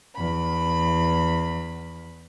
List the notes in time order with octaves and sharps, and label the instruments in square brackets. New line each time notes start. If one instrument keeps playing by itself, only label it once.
[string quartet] E2 B5